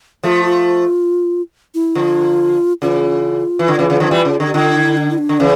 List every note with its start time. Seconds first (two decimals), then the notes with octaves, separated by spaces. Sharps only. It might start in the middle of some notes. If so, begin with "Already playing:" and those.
0.23 F3 A3 F4
0.45 F4
1.74 E4
1.95 D3 F3 F4
2.82 C#3 E3 F4
3.59 E3
3.68 D3
3.79 C#3 E3
3.90 C#3 E3
4.00 D3 F3
4.11 E3 G3
4.25 C#3
4.40 D3
4.45 G4
4.54 D3 F4
4.76 E4
4.97 D4
5.10 E4
5.18 D4
5.29 D3
5.40 C#3 E3 C#4